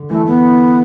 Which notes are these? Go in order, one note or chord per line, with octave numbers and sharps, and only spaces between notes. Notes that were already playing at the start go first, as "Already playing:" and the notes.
Already playing: D3
E3 A3
B3